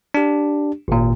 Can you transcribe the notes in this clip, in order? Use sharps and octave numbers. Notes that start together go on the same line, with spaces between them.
D4 G4
G#1 A#2